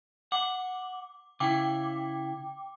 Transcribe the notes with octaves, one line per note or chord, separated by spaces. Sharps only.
F#5 D6
C#3 E4 G5 D6